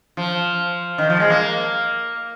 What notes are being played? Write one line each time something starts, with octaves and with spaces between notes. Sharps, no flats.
F3
D#3
F3
G#3
A#3